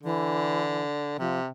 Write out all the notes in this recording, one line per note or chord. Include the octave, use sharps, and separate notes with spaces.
D3 E3
C3 F3